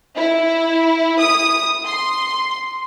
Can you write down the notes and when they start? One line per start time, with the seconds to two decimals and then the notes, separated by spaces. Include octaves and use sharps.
0.17 E4
1.21 D#6
1.85 C6